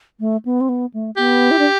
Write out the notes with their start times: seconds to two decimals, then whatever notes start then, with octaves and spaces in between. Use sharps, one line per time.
0.20 A3
0.45 B3
0.61 C4
0.69 B3
0.94 A3
1.17 B3 G4
1.51 E4
1.59 D4